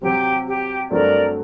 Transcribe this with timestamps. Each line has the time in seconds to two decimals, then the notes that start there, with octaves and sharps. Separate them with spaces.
0.01 C3 F#3 C4 G4
0.46 G4
0.90 G2 F#3 A3 C4 F#4 A#4 D5